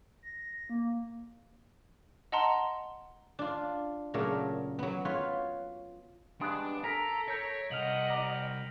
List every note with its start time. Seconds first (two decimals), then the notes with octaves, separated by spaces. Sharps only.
0.23 A#6
0.69 A#3
2.32 D#5 F#5 A5 A#5 C6
3.39 D4 F4
4.14 A#2 C#3 F#3 A3 A4 A#4
4.79 F#3 B3
5.05 F4 B4 C#5
6.41 G2 G#3 B3 D4
6.84 A4 A#4 G#5 A#5 A#6 B6 D7
7.28 A#4 C#5 G6 A#6
7.71 C2 D#5 F5 F#5 F6 F7 F#7
8.08 D5 A#5